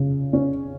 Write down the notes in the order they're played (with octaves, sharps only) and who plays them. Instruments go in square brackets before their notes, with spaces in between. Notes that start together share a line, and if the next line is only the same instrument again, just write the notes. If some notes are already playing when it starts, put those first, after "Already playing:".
Already playing: [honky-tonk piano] C#3
C#4